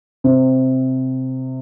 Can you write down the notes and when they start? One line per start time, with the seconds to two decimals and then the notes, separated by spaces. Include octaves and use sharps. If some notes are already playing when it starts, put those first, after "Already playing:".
0.24 C3